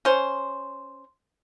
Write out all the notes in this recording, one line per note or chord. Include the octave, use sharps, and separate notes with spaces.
C#4 C5